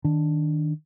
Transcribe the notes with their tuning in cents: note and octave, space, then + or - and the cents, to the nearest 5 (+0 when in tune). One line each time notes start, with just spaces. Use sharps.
D#3 +0 D4 +0